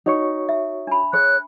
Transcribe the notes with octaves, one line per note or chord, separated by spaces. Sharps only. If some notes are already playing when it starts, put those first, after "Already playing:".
D#4 F#4 C#5 C#6
E5
D4 B5
G#4 C#5 F#6